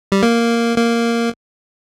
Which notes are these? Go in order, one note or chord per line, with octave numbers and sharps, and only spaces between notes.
G3
A#3
A#3